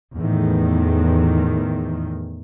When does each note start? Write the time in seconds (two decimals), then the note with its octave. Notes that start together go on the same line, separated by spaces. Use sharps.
0.16 E2 A2 D#3